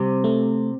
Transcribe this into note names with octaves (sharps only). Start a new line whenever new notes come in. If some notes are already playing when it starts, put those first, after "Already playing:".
Already playing: C3 G3
A3